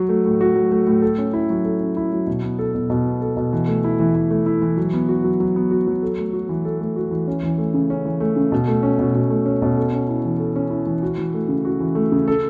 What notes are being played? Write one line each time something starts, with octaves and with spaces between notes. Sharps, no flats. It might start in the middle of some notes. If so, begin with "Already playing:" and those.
Already playing: F#3 F#4
A3
A2
F#4
F#3
A3
A2
A4
C#4
E4
F#3
A4
C#4
E4
F#3
B2
B3
A4
B2
B2
B3
A4
B2
E3
A3
E4
E3
E3
A3
E4
E3
F#3
B3
F#4
F#3
F#3
B3
F#4
F#3
A4
A3
F#4
E3
A4
A3
F#4
E3
C#4
E3
A3
C#3
C#4
E3
A3
C#3
B2
A3
C#4
B2
B2
A3
C#4
B2
A4
C#4
E4
E3
A4
C#4
E4
E3
F#4
E3
A3
C#3
F#4
E3
A3
C#3
A4